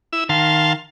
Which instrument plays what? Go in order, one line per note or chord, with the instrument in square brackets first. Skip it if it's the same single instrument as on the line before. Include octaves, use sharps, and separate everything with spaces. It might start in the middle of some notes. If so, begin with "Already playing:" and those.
[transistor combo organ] E4 E6
[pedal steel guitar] D#3 [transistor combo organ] F5 A5 C6